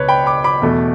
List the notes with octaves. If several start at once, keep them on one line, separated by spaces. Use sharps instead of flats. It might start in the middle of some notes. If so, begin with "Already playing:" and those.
Already playing: C#2 B2 B4 C#5
G5 B5
B5 D6
B5 D6
E2 B2 A3